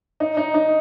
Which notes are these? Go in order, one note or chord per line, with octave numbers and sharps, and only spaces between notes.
D#4
D#4
D#4